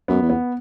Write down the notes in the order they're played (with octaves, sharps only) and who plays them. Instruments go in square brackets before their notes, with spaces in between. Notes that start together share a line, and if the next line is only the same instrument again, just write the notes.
[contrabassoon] F#2 [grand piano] B3
[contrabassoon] E2
[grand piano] B3